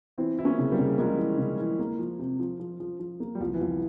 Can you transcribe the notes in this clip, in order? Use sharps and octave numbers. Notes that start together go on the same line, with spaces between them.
E3 C4 E4
E3 E4
A#3 C#4
C#3
G3 A#3
C#3
F3 G#3 A#3
E3
C#3
E3
A#3
F3
C3
F3
F3
F3
F3
A#3
G3
C2 F3
E3
C2 F3